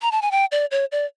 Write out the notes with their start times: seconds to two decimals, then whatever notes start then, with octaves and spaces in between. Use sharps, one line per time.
0.02 A#5
0.12 A5
0.22 G#5
0.31 G5
0.52 D5
0.71 C#5
0.92 D5